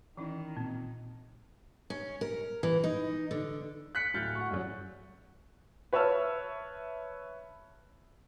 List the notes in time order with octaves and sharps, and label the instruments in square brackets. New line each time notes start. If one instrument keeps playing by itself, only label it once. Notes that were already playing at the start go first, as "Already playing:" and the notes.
[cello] D#3 [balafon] E3 C#4 E4
[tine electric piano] A#2 [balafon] C4
[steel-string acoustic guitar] C#4
A#4
E3
D#4
D3
[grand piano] F#6 B6 C#7
D1 F6 G6 A6
F#5 C#6
F#2 F#3
[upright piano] B4 C#5 E5 A5 E6 F6